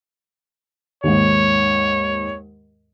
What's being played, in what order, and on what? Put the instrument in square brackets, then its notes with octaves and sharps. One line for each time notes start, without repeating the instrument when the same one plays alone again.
[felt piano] D#2 G#2 [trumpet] C#5